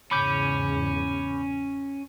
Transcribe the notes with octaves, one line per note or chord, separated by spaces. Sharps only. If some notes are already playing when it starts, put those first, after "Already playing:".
E2 G#2 C#3 C#4 B5 D6 G6